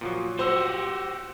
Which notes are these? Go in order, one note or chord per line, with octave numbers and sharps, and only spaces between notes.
A#2 F3 F#3
F#4 G4 C5 E6